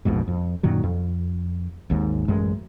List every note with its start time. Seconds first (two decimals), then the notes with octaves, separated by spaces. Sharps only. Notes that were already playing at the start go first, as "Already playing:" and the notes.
0.05 A#1 F2 G#2 B2
0.28 F2
0.63 F#2 A#2 D#3 F#3
0.84 F2
1.90 G#1 D#2 G#2
2.28 A1 F#2 G#3